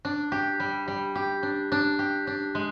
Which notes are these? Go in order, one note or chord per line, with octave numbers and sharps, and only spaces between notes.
D4
G4
G3
G3
G4
D4
D4
G4
D4
G#3